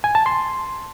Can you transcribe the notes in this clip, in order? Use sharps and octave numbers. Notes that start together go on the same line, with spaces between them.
G#5
A5
C6